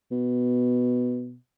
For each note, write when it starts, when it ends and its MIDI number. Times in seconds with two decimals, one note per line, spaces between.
0.11 1.36 47